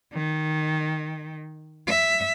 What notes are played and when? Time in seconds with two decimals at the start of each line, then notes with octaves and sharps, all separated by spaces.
0.13 D#3
1.88 E5